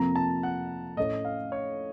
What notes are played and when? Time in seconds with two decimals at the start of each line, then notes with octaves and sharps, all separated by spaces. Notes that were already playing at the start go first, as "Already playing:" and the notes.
Already playing: F2 C3 F3 A#3 A#5
0.16 A5
0.43 F#5
0.97 A2 A3 C#4 A4 C#5 D#5
1.25 F5
1.52 C#5